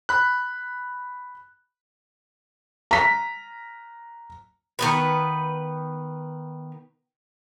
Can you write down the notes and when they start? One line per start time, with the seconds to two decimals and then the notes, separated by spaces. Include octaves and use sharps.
0.09 B5 F#6
2.91 A#5 B6
4.79 D#3 B3 B4